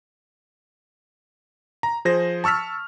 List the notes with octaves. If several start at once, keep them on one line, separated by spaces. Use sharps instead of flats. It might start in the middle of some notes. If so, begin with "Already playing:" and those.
A#5
F3 G#4 C5 A#6
A5 C#6 E6 F6 B6